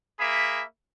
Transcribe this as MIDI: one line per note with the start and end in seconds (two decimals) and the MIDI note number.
0.18 0.63 58
0.18 0.63 68
0.18 0.63 76
0.18 0.63 83